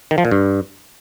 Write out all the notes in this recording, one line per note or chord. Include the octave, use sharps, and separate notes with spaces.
D#3
F3
A#2
G2